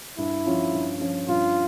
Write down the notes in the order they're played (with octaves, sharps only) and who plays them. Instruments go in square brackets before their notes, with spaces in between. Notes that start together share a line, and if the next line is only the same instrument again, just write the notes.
[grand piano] G2 [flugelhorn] E4
[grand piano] F3 C#4 F4
G2
F3 C#4 F4
[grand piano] G2 [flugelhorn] F4